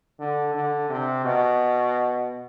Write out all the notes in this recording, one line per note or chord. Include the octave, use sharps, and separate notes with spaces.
D3
D3
C3
B2